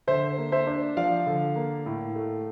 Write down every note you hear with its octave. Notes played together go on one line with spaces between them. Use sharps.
D3 C5 E5
A#3
C5 E5
D4
F3 D5 F5
D3
A#3
A2
A3